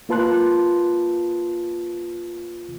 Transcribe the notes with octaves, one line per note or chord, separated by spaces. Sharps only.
A#3 F4 B4 A5 C6 F#6